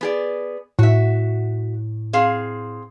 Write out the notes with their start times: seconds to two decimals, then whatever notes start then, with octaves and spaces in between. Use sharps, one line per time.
0.01 B3 G#4 D5
0.79 A2 F#4 E5
2.13 C4 G#4 F5